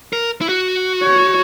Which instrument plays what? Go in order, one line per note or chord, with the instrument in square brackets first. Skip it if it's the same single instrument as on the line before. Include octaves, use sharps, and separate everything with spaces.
[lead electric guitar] A#4
E4
F#4
[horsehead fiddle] C#5